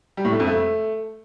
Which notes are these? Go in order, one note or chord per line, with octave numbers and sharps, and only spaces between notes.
G3
A2
A3
F2
A3